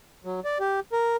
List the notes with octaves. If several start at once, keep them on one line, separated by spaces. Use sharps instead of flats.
F#3
D5
G4
A#4